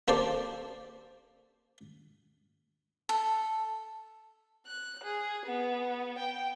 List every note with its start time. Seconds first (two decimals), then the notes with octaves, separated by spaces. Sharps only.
0.08 A#3 C4 G4 A4 C5 D5
3.09 A4
4.66 F#6
5.04 G#4
5.46 B3
6.18 G5